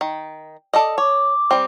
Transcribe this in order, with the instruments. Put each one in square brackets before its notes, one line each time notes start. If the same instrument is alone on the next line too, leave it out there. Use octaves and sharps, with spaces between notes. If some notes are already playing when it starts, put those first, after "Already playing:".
[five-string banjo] D#3
A4 D5 D#5
[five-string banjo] C#5 [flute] D6
[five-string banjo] G3 C4